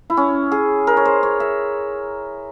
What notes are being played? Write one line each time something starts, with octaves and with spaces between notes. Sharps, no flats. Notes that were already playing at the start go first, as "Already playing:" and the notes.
E4
C#4
G#4
A#4
C#5
C5
C#5
E5